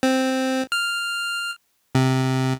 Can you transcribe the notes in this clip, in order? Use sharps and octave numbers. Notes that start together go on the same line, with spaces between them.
C4
F6
C3